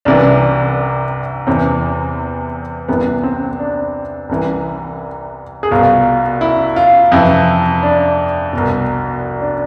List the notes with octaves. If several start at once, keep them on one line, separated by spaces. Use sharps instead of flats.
C2 C3 E3 D4
E2 C3 E3 C4
C2 C3 E3 B3
C4
D4
C2 C3 E3
G#4
C2 B2 F4
E4
F4
F2 C3 E3 E4
D4
C2 B2
D4